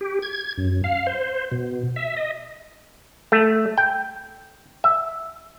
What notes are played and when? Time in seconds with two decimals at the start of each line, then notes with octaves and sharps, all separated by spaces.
0.01 G4
0.22 G#6
0.58 F#2
0.84 F5
1.07 C5
1.51 B2
1.96 E5
2.16 D#5
3.32 A3
3.78 G5
4.84 E5